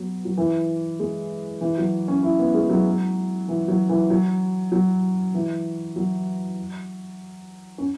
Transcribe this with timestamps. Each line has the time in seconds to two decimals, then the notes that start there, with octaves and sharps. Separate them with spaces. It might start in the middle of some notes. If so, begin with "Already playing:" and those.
Already playing: F#3 B3
0.25 F#3
0.37 E3
1.00 G#3
1.61 E3
1.78 F#3
2.08 C#4
2.23 E4
2.39 B3
2.54 G#3
2.69 F#3
3.48 E3
3.68 F#3
3.89 E3
4.10 F#3
4.72 F#3
5.34 E3
5.96 F#3
7.78 C#4